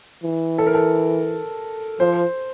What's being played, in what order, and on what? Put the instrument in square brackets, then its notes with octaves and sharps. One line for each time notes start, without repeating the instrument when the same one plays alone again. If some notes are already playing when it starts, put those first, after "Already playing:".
[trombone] E3
[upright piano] A4
A#4
A4
[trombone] F3 [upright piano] C5